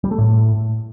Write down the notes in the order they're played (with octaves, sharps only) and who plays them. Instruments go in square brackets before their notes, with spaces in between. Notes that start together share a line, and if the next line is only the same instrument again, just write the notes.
[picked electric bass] G3
A3
A2